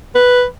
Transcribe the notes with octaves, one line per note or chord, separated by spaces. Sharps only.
B4